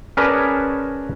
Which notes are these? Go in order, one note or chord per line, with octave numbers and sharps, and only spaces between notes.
C#4 G#4 A#4 B4 D5 A5